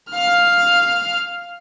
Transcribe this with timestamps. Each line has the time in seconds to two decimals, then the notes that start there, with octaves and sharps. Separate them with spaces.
0.11 F5 F6